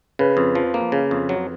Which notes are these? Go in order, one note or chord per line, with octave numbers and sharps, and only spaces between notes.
C#3 B4
F2
F3
A#3
C#3
F2
F#3